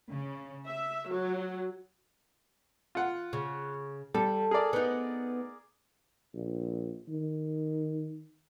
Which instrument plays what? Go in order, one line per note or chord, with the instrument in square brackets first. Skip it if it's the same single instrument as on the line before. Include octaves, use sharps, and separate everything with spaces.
[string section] C#3
E5
F#3
[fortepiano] F4 F#5
[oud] C#3
[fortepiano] G3 [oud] A4
[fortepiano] G#4 A#4 D5
[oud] B3 D#4
[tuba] A#1
D#3